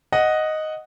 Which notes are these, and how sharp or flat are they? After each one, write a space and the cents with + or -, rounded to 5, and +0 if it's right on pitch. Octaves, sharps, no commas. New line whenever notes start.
D#5 +0 F#5 +0